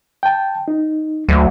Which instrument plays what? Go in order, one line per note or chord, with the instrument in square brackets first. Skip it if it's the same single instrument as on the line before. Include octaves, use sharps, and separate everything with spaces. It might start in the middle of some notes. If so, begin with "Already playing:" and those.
[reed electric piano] G5 A5
D#4
[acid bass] D2 [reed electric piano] F#3 A3